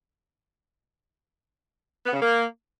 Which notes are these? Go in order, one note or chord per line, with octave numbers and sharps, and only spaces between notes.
B3
C#3
A#3